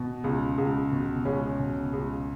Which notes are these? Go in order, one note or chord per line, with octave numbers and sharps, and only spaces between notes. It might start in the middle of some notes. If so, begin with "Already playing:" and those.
Already playing: B2
C#2
C#2
B2
C#2 C#4
B2
C#2